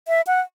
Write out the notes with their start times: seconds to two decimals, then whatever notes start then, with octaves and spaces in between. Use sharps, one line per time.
0.08 E5
0.27 F#5